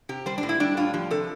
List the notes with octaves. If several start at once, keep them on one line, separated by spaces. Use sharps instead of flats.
C3 G4
G3 C5
D4
A2
E4
G3 D4
A2 F4
F3 G4
C3 A4